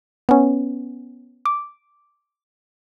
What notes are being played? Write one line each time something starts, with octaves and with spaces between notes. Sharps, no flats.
B3 C#4
D6